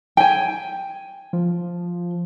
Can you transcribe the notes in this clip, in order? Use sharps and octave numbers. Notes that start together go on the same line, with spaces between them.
G5 G#5
F3